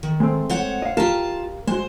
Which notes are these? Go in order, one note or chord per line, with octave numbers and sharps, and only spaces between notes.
D#3
G#3 A3 C4
C5 C#5 F#5
D#5 F5
F4 G4 A#4 F5 A5
G#3 F#4 C5